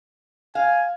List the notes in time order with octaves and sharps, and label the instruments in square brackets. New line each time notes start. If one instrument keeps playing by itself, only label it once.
[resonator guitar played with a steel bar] F5 [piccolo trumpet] G#5